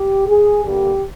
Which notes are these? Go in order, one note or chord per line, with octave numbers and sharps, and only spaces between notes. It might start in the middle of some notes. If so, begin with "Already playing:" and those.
Already playing: G4
G#4
G2 D3 G3 A#3 G4